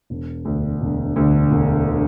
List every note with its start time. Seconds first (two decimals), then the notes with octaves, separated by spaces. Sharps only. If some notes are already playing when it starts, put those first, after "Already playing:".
0.10 E1
0.45 D2 D3
0.81 E1
1.16 D2 D3
1.51 E1
1.88 D3